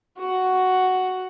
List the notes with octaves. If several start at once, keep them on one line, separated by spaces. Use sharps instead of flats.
F#4 F#5